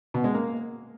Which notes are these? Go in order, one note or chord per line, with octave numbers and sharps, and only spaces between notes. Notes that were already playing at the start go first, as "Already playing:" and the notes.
B2
G#3
A#3